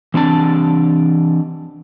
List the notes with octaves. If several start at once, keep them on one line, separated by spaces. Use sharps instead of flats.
E3 C4 D4 A5